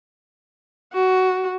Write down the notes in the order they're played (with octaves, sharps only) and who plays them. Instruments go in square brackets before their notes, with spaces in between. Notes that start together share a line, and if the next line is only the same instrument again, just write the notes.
[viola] F#4